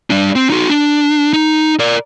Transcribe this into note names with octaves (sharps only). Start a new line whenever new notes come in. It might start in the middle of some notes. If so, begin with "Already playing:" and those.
G3 D4
C4
D#4 F#4
D4
D#4
A#4 D5